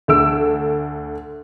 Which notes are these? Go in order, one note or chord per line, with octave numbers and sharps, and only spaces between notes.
D2 A4 E6 D7